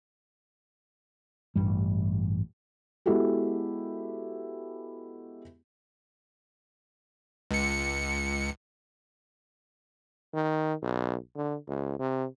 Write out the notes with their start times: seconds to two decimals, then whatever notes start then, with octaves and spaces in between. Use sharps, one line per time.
1.56 A1 G2 G3
3.06 G#3 B3 E4 F#4 G4 A4
7.51 C#2 C#7
10.34 D#3
10.82 B1
11.36 D3
11.67 C#2
11.99 C3